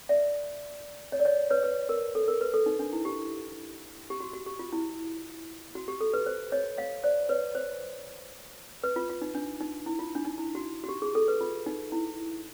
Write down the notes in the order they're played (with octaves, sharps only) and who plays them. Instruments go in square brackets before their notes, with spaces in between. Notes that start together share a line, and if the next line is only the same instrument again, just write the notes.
[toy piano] D5 E5
C#5 D#5
D5
C#5 D#5
B4 C#5
B4
A#4
A4
A#4
B4
A4
D#4
D4
E4
G4
G4
F#4
F#4
G4
F4
E4
F#4
G4
A4
B4
C5
C#5 D#5
D#5 F5
C5 D5
B4 C#5
C5
B4
F4
F4
D#4
D4
D#4
E4
F4
D4
D#4
E4
F#4
F#4
G4
G#4
A4
B4
F4
D#4
E4